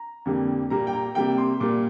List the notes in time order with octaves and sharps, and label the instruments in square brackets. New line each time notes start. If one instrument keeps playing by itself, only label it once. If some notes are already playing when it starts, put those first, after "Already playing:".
Already playing: [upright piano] A#5
F2 D3 G3 A#3
A#2 G3 A#3 A#5
G5
A#5
C3 G3 A#3 G5
C6
A#2 G3 A#3 D6